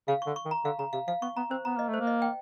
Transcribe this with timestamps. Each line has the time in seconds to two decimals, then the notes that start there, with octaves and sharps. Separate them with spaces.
0.08 C#3 F5
0.22 D3 C#6
0.36 C#6
0.45 D#3
0.51 A#5
0.65 D3 F5
0.79 C#3 A#5
0.93 C3 F5
1.08 F3 F5
1.22 B3 C#6
1.37 B3 A#5
1.50 C4 C5
1.65 B3 A#5
1.76 A#3 D#5
1.88 A3
1.94 C5
2.00 A#3
2.07 D#5
2.22 G5